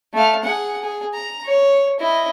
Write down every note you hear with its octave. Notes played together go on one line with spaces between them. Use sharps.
A3 F5
G#4 F#5
G#4
A#5
C#5
E4 D#5